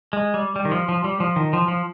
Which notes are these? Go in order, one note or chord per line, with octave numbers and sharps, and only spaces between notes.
G#3
G3
G3
D#3
F3
F3
G3
F3
D#3
F3
F3